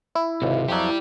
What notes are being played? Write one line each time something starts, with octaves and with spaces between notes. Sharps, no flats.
E4
G#1 C#2 C3
F2 F#3 G4 D5